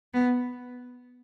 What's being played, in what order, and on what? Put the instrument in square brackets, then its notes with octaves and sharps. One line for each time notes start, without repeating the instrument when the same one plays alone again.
[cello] B3